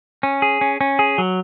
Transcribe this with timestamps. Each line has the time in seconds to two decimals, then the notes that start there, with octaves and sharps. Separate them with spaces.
0.23 C#4
0.42 G#4
0.61 C#4
0.81 C#4
0.99 G#4
1.18 F#3